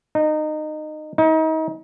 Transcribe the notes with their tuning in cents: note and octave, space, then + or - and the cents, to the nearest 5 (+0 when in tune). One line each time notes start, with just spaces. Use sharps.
D#4 -20
D#4 +35